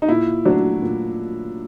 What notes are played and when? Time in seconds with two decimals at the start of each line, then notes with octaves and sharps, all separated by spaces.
0.02 D#4
0.08 A#2 E4
0.45 F#3 A3 D4
0.82 A#2